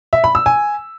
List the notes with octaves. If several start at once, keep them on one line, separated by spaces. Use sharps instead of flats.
E5
B5
E6
G#5